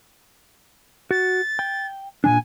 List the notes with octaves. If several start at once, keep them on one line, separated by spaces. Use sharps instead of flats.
F#4 A6
G5
A#2 E3 D4 G#5